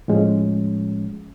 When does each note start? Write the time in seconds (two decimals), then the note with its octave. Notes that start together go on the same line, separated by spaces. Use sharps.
0.08 A2 F3 G#3 C#4